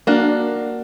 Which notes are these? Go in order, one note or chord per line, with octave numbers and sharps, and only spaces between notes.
A#3 D4 F#4